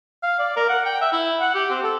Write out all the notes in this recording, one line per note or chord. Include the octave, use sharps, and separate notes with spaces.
F5
D5
A#4
F#5
G5
E5
E4
F#5
G4
C4
A4